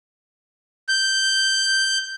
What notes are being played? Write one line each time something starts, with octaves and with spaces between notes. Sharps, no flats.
G6